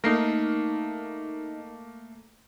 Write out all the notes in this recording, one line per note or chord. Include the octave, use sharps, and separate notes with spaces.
A3 A#3 D#4 A#4 C7